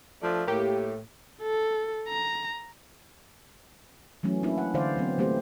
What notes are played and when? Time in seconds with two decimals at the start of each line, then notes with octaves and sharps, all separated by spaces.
0.21 F3 A3 D4
0.47 A2 A#3 G4
1.42 A4
2.08 A#5
4.23 E3 F#3 A3 C#4
4.43 A#3 C#4 D4 E4
4.58 F#5
4.74 D3 E3 C5 D5 F5
4.96 F#3 B3 C4
5.18 E3 A3 A#3 C4 G4 C5